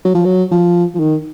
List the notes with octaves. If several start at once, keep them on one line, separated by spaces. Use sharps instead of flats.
F#3
F3
F#3
F3
F3
D#3